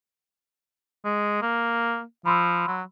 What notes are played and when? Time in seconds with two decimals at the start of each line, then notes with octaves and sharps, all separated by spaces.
1.05 G#3
1.42 A#3
2.26 F3 B5 C6 E6
2.67 F#3